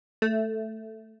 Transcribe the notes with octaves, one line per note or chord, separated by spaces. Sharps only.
A3